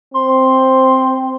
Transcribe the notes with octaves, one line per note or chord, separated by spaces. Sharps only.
C4 C6